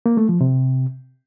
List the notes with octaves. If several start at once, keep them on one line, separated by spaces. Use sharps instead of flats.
A#3
A3
F3
C3